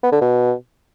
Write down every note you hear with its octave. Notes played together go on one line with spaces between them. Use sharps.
B3
D3
B2